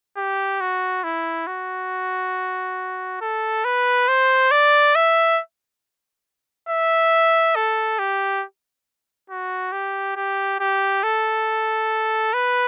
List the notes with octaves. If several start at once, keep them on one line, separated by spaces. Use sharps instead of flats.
G4
F#4
E4
F#4
A4
B4
C5
D5
E5
E5
A4
G4
F#4
G4
G4
G4
A4
B4